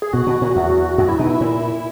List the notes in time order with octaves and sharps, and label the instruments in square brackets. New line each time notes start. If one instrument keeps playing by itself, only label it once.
[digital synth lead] G#4
[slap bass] B2 [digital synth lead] F#4
[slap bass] B2
A#2
E2
[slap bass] F#2 [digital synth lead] F#4
[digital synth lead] E4
[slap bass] B2 [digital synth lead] D#4
[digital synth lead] E4
[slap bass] A#2